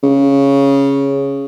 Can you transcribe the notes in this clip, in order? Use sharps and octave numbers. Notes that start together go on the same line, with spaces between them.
C#3